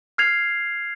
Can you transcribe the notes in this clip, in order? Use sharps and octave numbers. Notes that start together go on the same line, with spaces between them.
F6 G#6 C7 F7